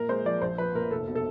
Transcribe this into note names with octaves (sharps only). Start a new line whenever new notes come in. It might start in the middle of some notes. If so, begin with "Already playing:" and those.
Already playing: A#2 A#4
G#3 C5
F3 D5
A#1 C5
F3 B4
A#2 A#4
F1 A4
B2
A4